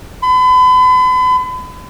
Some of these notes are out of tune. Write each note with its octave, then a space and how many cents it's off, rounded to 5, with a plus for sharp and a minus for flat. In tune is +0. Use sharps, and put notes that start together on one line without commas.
B5 +40